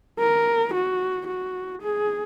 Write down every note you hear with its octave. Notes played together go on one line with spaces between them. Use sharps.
A#4
F#4
F#4
G#4